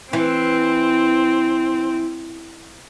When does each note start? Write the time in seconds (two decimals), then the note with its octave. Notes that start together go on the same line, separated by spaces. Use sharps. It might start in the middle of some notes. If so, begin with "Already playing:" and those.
0.13 E3 C4